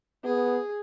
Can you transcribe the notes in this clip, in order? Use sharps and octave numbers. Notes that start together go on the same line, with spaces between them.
B3 G#4